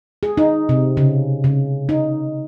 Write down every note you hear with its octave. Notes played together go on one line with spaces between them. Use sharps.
G#4
D#4
C3
C#3
C#3
D#4